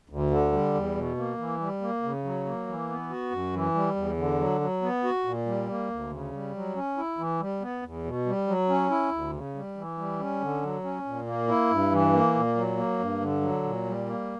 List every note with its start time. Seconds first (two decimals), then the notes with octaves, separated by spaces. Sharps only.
0.10 D2
0.31 D3
0.52 G3
0.74 E2
0.95 B2
1.17 A#3
1.38 E3
1.60 G3
1.81 A#3
2.03 C#3
2.24 F#3
2.46 A#3
2.67 E3
2.89 B3
3.10 F#4
3.31 F#2
3.53 E3
3.75 G3
3.96 E2
4.17 D3
4.39 F#3
4.61 F#3
4.82 B3
5.04 F#4
5.25 A#2
5.46 G3
5.68 A#3
5.90 D2
6.11 C#3
6.33 G3
6.54 F#3
6.76 C#4
6.97 E4
7.18 E3
7.40 G3
7.61 B3
7.82 E2
8.04 B2
8.26 G3
8.47 F#3
8.69 C#4
8.90 E4
9.12 D2
9.33 C#3
9.55 G3
9.76 E3
9.98 G3
10.20 C#4
10.41 D3
10.62 F#3
10.84 C#4
11.05 A#2
11.27 A#3
11.48 E4
11.70 G2
11.91 E3
12.13 A#3
12.34 A#2
12.56 F#3
12.77 A#3
12.99 G2
13.20 D3
13.41 F#3
13.64 A#2
13.85 G3
14.06 A#3